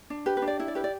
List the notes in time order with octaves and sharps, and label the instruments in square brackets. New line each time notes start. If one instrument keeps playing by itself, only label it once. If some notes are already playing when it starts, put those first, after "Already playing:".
[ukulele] D4
G4 B4
B4
D4
D5
E4 E5
D5
G4 B4
D5